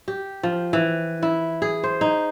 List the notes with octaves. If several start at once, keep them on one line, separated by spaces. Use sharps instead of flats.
G4
F3
E3
E4
G#4
C5
D#4